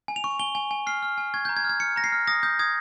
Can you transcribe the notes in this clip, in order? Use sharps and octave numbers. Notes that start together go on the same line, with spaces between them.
G#5
F7
C#6
G#5 G7
G#5
G#5
F6 C7
F6
G#5
C#6 G#6
A#5 G6
G#6
F6
G#6
F6 C#7
A#5 A#6
C7
F6
D#6 A#6
D#6 G6
D#6 G#6